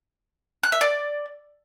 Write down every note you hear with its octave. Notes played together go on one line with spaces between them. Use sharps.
F#6
E5
D5